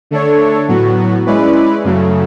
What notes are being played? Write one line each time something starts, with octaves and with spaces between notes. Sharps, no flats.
D3 A3 D4 A4 C#5
A2 F#3 B3 F#4
G#3 C#4 E4 B4 D5
F#2 C#3 F#3 A3